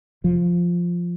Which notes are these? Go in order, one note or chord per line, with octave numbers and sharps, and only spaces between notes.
F1 F3